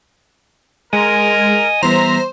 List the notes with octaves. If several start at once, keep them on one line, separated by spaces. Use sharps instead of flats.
G#3 A#4 D#5 G#5 D#6
E3 G3 B3 C5 E5 A#5